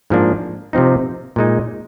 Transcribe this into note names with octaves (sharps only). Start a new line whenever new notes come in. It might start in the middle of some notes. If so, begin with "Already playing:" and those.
G#2 F3 A#3 D4
C3 F3 C4 D#4
A#2 G#3 D#4